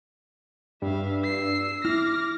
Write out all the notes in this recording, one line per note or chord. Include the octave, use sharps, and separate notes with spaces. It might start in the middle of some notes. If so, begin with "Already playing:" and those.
G2 E5 F5
E6 C7
E4 D6 F6 A#6